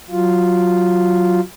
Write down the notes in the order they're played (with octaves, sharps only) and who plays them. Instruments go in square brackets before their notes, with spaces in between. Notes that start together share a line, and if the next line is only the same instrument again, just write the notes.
[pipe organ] F#3 F4